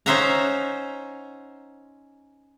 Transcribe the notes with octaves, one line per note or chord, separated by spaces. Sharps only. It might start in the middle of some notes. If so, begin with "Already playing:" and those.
C#4 D#4 C5 E5 F#5 A#5